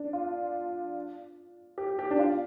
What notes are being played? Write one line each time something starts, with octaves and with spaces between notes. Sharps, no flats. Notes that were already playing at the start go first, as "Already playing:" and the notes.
Already playing: D4
F4
G4
G4
D4
F4